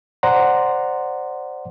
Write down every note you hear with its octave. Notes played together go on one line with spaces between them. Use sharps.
C5 D5 F#5 A#5 C6